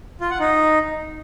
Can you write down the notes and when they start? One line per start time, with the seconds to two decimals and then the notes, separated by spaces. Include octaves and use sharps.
0.21 F4
0.30 F#5
0.40 D#4